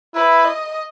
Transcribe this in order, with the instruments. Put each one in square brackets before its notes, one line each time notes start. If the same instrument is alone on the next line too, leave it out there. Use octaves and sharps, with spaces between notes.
[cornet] E4 [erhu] B4
[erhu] D#5